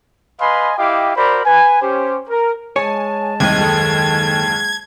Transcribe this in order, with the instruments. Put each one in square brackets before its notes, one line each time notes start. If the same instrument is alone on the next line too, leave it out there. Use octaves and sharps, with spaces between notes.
[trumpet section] B4 D#5 F5 G#5 B5 C6
E4 G4 D#5 F5 G5 D6
F#4 A#4 C5 D5 B5
B4 G#5
C#4 G4 C5
A#4
[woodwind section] G#3 A5 [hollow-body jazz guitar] C#5 [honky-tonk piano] G#5
[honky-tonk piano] F#1 D#2 [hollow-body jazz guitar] C3 G3 D#5 [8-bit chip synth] G#6
[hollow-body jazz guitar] D#3 G#4 A4